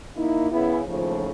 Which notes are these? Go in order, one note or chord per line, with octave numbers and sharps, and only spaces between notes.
A#3 D#4 E4
C#3 B3 E4
D#2 A2 C#3 F3